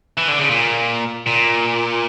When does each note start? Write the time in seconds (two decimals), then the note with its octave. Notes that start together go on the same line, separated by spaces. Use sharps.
0.18 E3
0.29 D3
0.39 C#3
0.50 A#2
1.26 A#2